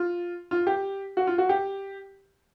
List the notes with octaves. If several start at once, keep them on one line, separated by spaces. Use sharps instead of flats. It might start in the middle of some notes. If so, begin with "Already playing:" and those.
Already playing: F4
F4
G4
F#4
F4
F#4
G4